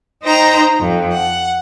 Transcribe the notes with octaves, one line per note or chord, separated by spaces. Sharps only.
D#4 C5 D#5 G5 A#5
F2
F#5